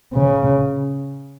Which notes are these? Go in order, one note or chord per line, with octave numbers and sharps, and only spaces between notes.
C#3